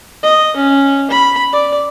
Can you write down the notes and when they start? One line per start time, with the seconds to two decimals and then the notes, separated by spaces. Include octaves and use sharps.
0.23 D#5
0.56 C#4
1.10 B5
1.52 D5